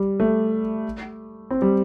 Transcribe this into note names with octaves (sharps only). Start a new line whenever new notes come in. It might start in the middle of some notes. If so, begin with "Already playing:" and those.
Already playing: G3
A3
C4
G3